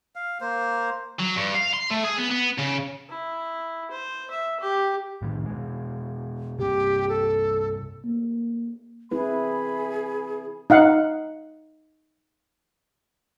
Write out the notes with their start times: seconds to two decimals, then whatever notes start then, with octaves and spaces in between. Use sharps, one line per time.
0.16 F5
0.41 A#3 C5
1.19 F#3
1.36 G2
1.54 F5
1.74 C6
1.91 A3
2.05 G#4
2.19 B3
2.32 B3
2.59 C#3
3.09 E4
3.91 C5
4.31 E5
4.60 G4
5.22 C2 A2 D#3
5.46 B2 G#3
6.59 G2 C3 G4
7.09 A4
8.05 A#3
9.11 C4 E4 G#4 B4 B5
10.70 D#4 F5 F#5